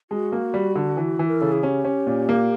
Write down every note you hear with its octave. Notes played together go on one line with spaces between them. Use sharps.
G#3 F#4
A#3
G3
D3
E3
E3
A#4
C#3 A4
G#4
C#4 G4
C#4
A#2
A#3